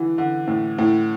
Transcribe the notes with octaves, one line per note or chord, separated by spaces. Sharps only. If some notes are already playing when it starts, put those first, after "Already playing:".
Already playing: D3 E3
D3
A2
A2